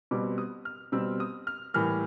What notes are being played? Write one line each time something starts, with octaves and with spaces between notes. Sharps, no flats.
B2 G3 C4 D6
D#6
F6
B2 G3 C4 E6
D#6
F6
A2 E3 G3 A#3 F6